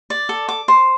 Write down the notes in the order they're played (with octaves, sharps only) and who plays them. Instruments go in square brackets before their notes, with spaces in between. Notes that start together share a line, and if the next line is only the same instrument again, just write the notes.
[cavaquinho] D5
A4
D6
C5